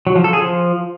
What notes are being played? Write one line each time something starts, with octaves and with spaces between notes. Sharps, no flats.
F#3
F3
A4
G#4
F3